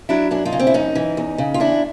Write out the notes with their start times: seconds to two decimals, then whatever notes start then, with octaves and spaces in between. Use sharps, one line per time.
0.09 F#3 D4 E4
0.31 F#2 D4 E4
0.45 D#4 F4
0.52 C#3
0.59 C4 D4
0.67 E4
0.74 F#2 C#4 D#4
0.95 E3
1.17 E2
1.38 C#3
1.54 F4
1.60 E2 D4 E4